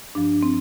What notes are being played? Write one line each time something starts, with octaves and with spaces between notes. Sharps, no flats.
G2 F3 D4
C4